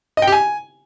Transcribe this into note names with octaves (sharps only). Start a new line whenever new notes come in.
D#5
G5
G4
G#5